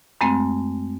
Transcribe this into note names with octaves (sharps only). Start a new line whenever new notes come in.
F#2 G#3 A3 C4